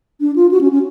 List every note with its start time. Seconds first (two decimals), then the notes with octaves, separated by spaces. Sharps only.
0.21 D4
0.36 F4
0.51 F#4
0.61 C#4
0.72 C#4